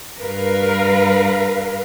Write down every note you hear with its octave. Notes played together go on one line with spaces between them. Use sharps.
G2 A#4 B4 F5